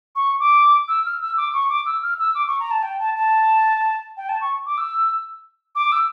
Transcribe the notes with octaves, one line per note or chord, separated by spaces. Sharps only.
C#6
D6
E6
F6
E6
D6
C#6
D6
E6
F6
E6
D6
C#6
A#5
A5
G5
A5
A5
G5
A5
C#6
D6
E6
D6
E6